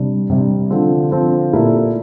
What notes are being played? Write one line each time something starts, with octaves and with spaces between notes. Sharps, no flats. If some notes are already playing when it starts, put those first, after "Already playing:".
Already playing: C3 G3 D4
C3 G3 D4
D3 F3 C4 F4
D3 F3 C4 F4
A#2 A3 E4 G4 A#4